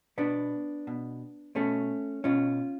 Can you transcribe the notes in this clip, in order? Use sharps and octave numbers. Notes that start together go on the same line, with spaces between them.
B2 B3 D4
B2
B2 A3 C#4
B2 C#4 F4